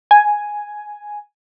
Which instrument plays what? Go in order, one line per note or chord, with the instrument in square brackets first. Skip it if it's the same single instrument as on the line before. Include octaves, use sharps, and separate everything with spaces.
[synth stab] G#5